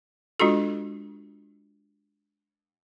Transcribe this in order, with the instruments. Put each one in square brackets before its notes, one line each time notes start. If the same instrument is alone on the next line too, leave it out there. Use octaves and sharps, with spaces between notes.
[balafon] G#3 D4 F4 F#4 A4